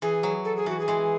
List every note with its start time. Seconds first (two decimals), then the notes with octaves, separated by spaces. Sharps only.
0.02 E3 G#4
0.23 F#3
0.45 A4
0.56 G#4
0.66 E3 F#4
0.80 G#4
0.88 E3 G#3